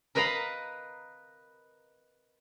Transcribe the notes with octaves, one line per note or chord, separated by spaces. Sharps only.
A#4 B4 D#5 F5 A#5 B5